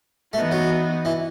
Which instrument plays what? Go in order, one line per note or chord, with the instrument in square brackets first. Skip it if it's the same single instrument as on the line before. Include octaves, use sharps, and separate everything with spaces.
[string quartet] E3 B3 D#4 F#4 [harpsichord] A3
[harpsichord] F#3
E3